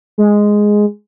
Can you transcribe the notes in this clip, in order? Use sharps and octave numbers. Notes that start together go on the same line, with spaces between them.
G#3